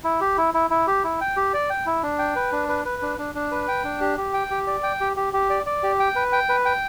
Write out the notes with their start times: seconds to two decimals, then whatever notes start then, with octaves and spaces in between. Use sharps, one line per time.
0.04 E4
0.21 G4
0.37 E4
0.54 E4
0.70 E4
0.87 G4
1.04 E4
1.21 G5
1.37 G4
1.54 D5
1.70 G5
1.86 E4
2.03 D4
2.19 G5
2.36 B4
2.52 D4
2.69 B4
2.85 B4
3.02 D4
3.18 D4
3.35 D4
3.52 B4
3.68 G5
3.85 D4
4.01 G4
4.18 G4
4.34 G5
4.51 G4
4.67 D5
4.83 G5
5.01 G4
5.17 G4
5.33 G4
5.50 D5
5.66 D5
5.83 G4
6.00 G5
6.16 B4
6.32 G5
6.49 B4
6.65 G5